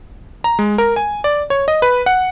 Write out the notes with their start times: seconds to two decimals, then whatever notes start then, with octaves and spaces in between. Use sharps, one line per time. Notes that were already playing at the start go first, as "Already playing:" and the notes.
0.44 A#5
0.59 G#3
0.78 A#4
0.96 G#5
1.24 D5
1.50 C#5
1.68 D#5
1.82 B4
2.06 F#5